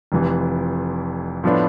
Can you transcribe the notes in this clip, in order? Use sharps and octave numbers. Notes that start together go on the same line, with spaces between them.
F1 F2 E3
A2 F3 B3 D4